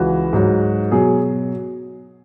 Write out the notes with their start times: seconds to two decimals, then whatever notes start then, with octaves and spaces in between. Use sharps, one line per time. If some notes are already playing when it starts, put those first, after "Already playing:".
Already playing: C#2 C#3 E3 F#4
0.33 G#2 F#3
0.91 B2 F#3 G#4